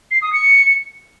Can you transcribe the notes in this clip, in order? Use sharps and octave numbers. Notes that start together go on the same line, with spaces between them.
C7
D#6
C#7